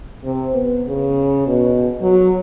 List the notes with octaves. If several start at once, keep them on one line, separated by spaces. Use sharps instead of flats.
C3
B3
C#3
B2
F#3